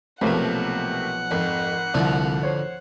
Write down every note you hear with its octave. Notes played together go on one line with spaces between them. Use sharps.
B1 C3 F3 A3 A#3 B4 F#5
G#1 F2
C2 D3 F3
C5 C#5